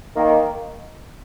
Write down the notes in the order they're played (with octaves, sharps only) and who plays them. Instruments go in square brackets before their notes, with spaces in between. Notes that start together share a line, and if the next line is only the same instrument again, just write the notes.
[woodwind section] D#3 A#3